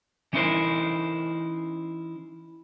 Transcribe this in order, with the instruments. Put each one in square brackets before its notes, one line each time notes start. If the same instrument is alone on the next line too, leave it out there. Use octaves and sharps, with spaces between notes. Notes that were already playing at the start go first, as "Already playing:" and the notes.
[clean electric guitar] E3 C#4 D#4 E4 A#4 C5